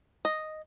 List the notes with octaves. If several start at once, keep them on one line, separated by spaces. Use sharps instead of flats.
D#5